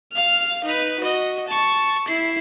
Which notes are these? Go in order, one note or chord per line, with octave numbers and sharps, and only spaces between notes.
F5 F6
D#4 B4
F#4 D#5
A5 C#6
E4 C7